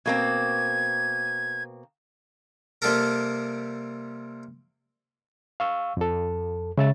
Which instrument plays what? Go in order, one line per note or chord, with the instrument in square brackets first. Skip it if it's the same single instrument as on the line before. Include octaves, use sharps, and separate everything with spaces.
[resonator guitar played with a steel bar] B2 A#3 C4 [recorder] G#6
[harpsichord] C3 G3 A#3 G4 A4 A#4
[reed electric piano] F5 C#6 E6
F2 A4
[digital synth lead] C#3 [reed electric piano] G#3 E5 A6